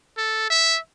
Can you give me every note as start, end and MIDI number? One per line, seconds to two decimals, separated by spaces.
0.18 0.46 69
0.50 0.78 76